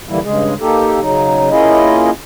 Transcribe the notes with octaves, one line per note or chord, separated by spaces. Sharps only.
D3 E3 G3 A#3 E4
G2 C#3 G#3 G#4
A#3 D#4 G4 A4
C#3 F#3 D#4
A#3 C#4 E4 F4 G#4 D#5